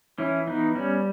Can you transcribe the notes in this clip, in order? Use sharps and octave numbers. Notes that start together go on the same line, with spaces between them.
E3 C#4 E4
B3 D#4
G3 C#4